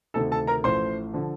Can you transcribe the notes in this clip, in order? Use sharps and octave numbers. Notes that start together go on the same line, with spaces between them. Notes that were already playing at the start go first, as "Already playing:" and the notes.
D2 C3 D#3 A4 A5
A4 A5
A#4 A#5
A1 A2 F3 C5 C6
D3 F3